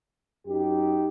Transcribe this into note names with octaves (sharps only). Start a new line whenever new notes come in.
F#2 D#4 G4